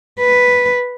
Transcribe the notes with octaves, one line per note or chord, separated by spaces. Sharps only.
B4